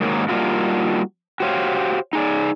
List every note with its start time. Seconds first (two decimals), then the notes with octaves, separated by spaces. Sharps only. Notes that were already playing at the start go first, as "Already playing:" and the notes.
0.01 G#2 D#3 F#3 A#3
0.29 G3 A#3 D4 D#4 F4 F#4
1.40 F#4 G4 C5 C#5 F5
2.13 D#4 G#4 D5